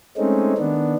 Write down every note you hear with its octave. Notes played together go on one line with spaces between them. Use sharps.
G#3 A3 C4 C#4 D#4
D#3 B3 D4